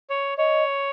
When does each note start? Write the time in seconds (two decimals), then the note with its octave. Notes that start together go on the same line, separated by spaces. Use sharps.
0.10 C#5
0.37 C#5 D#5